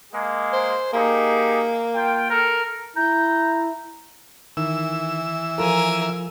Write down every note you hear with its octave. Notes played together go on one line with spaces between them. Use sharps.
G#3 A#3 G#4
C5
A#3 D#4 G4 G#4
F4 G5
A4 A#4
E4 A#5 G6
D#3 E3 E6
F3 F4 A4 A#4 G#5